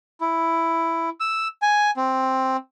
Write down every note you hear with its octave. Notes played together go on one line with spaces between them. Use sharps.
E4
E6
G#5
C4